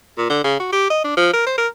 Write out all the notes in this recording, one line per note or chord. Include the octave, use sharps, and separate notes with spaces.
A#2
D3
C#3
F#4
G4
D#5
D4
F3
A#4
C5
A#4